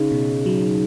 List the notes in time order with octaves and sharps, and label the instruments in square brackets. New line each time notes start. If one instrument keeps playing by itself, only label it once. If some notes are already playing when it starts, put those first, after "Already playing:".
Already playing: [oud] C#3 [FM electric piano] D#4
[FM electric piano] B2
F#3